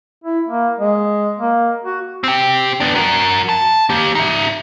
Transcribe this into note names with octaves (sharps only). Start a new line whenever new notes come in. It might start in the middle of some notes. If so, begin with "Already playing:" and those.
E4
A#3
G#3
A#3
F#4
C4 G4
B3 D4
F#4 A#4
A5
A#3 G4
D#4 E5